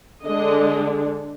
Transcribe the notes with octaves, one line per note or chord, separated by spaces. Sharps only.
D3 G#3 D4 D#5